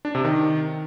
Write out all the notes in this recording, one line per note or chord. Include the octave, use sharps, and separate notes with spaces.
D4
C3
D#3